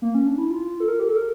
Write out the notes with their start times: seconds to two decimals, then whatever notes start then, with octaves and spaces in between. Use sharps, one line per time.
0.02 A#3
0.15 C#4
0.26 D4
0.38 E4
0.50 F4
0.80 A4
0.88 A#4
1.00 G4
1.08 A4
1.16 A#4